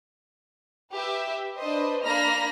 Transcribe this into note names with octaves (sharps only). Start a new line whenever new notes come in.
G4 B4 E5
D4 B4 C5 D#5
A#3 D4 A#5 B5 F6 A#6